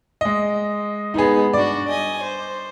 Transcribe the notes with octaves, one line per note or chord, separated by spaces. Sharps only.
G#3 D#5
G#3 B3 D#4 G#4
G2 D4 F#4 D5
D#5 G#5
C5